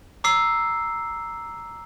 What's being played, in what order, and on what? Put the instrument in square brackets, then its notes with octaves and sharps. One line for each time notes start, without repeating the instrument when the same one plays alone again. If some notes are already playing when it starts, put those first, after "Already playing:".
[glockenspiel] A#5 D6 E6 C7